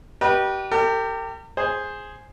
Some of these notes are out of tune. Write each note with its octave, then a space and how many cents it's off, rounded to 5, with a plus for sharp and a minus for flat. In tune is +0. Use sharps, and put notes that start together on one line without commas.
G4 -25 B4 -35 D#5 -35
G4 +0 A#4 -45
G#4 +0 C5 +5